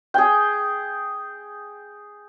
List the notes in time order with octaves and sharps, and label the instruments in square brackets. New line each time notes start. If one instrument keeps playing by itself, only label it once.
[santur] G#4 G5